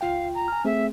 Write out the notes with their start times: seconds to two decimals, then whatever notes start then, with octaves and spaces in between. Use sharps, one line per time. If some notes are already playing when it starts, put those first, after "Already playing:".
0.01 C#2 F4 F5 G5
0.34 A#5
0.48 G#5 F6
0.65 A3 C4 G#4 E5